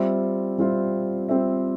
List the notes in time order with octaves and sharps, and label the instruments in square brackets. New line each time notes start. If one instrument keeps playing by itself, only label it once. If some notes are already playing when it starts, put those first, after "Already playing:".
Already playing: [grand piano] G3 C4 F4 C5 E5
G3 C4 F4 C5 E5
G3 C4 F4 C5 E5